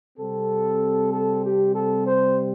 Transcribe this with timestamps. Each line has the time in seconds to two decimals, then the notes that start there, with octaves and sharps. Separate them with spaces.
0.18 C3 G3 C4 A4
1.11 A4
1.42 G4
1.74 A4
2.04 C5